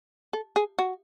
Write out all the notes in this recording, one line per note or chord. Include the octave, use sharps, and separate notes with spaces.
A4
G#4
F#4